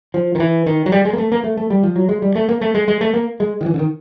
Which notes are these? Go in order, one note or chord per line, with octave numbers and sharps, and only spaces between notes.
F3
D#3
E3
D#3
F#3
G3
G#3
A#3
A3
A#3
A3
A3
G3
F3
F#3
G#3
G3
A3
A#3
A3
G#3
G#3
A3
A#3
G#3
D#3
E3
D3
D#3